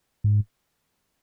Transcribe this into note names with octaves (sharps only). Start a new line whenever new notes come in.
G#2